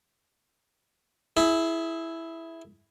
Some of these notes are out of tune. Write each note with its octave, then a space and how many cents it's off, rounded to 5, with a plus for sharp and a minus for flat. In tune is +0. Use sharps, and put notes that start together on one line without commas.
E4 +0 G#4 +25